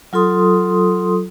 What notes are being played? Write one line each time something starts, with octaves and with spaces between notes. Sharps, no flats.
F#3 F4 A4 C6 D#6